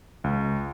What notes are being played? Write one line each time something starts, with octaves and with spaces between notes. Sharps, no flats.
C#2